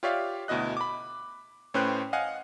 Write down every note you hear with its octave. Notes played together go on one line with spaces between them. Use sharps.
F4 G4 C#5 D5 E5 F5
D2 B2 E4 D#5 F#6
B5 D6
A2 C#4 B4 C5 G5 F#6
D#5 F5 F#5 G#5